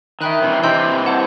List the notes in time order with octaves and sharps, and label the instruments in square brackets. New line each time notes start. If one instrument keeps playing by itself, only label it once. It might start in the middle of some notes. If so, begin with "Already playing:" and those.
[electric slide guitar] D#3 [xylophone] E5 G5 B5 F#6
[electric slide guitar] C3 E3
[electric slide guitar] C3 E3 [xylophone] D#5 G5 C6 E6 G6
[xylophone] C5 F#5 A5